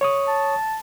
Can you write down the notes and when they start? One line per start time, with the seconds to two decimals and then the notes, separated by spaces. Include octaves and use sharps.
0.01 C#5 C#6 D#6
0.28 A5